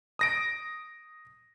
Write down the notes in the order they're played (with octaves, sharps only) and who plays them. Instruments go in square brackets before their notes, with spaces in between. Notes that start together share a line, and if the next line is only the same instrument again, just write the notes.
[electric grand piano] D#6 A#6 D7